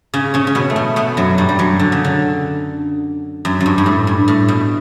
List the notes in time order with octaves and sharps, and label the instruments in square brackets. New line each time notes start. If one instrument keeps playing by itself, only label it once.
[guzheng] C#3 C#4
C#3 C#4
C#4
B2 B3
A3
B2 B3
B2 B3
F#2 F#3
G2 G3
G3
F#2 F#3
D3
C#3
D3
F#2
F#2
G2
G2
A2
G2
A2
B2